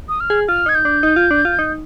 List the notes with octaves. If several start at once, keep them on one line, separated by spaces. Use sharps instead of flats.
D#6
F6
G#4
F4 F6
D#4 G#6
G6
D4
D#4
F4
D4
F4
D#4